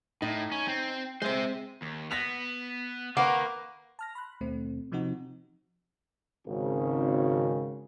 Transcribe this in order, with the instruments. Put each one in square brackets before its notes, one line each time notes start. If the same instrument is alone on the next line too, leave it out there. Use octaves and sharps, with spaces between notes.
[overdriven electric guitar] A2 [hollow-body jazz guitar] D#4
[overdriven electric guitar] C#4
C4
[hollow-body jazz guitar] G#3 C4 [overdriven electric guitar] C5 E5
[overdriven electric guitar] D#2
[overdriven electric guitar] B3 [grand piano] A#6 B6 F7
[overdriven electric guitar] D#3 [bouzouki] A#3 [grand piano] A#4 B4 [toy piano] F#5
[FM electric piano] A5 F6 A#6
B5 C6 F#6
D#2 B2 A3 C4
C3 F3 C4 D#4 F#4
[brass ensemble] G#1 C#3